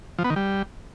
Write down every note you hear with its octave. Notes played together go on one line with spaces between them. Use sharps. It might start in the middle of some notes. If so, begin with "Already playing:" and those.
F3
B3
D#3
G3